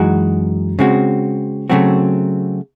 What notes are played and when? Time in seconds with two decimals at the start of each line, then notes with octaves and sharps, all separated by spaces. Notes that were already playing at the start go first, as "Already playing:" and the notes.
Already playing: F#2 E3 G#3 D#4 F#4
0.79 C#3 G#3 C4 F#4
1.70 C#3 F#3 A3 C4 F#4